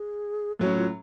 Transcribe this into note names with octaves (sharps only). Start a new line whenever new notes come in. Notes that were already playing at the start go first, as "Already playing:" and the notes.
Already playing: G#4
A2 F#3 C#4 F#4
F4